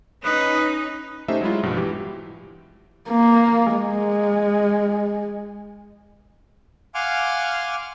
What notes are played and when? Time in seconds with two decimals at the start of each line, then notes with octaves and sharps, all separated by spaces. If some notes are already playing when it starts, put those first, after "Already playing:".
0.25 C#4 D#4 B4 D#6
1.28 A3 C#4 D#4 G4 C5 E5
1.41 F#3 G#3 E4 F4
1.63 A#1 G2 B2
1.77 E3 G4
3.10 A#3
3.75 G#3
6.94 F5 F#5 G#5 C6 D6 F6